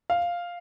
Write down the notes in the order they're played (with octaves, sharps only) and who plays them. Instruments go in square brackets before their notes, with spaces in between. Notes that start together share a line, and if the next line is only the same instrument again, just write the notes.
[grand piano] F5